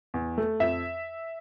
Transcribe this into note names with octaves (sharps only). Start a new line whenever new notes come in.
E2
A3
F2 E5